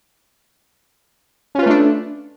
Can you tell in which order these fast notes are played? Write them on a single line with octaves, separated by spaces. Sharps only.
C#4 F4 B4 A3 D4